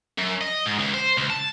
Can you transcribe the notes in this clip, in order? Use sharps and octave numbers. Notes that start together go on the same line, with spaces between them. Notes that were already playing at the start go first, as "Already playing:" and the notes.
F#2
D#5
G#2
C#2
C5
C#2
A5